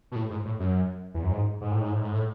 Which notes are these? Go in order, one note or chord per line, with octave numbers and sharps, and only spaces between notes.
B2
A2
G#2
A2
F#2
E2
F#2
G#2
G#2
A2
G#2
A2
G#2
A2